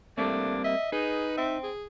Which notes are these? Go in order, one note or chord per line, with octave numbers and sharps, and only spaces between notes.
G3 A3 A#3 C4 D4
D#5 E5
D#4 G#4 B4
C4 E5
G#4